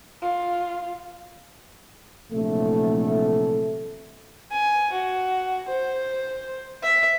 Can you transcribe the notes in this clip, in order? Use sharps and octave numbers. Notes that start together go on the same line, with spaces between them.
F4
A#1 C3 E3 F#3 A3
G#5
F#4
C5
E5